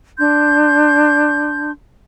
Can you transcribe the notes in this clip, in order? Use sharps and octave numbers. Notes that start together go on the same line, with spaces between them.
D4 C6 G6